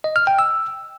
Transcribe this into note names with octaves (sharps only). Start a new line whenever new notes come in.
D#5
F6
G5
E6